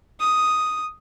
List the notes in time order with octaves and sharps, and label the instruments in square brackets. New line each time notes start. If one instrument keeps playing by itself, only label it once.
[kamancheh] D#6